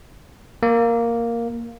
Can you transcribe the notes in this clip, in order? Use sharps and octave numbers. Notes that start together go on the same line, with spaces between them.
A#3